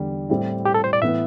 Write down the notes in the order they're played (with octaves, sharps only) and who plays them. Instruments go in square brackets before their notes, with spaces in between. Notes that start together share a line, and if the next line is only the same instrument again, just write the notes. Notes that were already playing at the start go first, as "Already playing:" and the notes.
Already playing: [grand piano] E2 D3 G3
A2 G3 C4 E4
[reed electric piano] G4
A4
C5
D5
[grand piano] A2 E3 B3 E4 [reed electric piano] E5